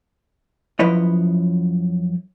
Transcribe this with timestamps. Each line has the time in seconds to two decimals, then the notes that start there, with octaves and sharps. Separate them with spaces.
0.79 F#2 F3 E4 B4 C#5 D#5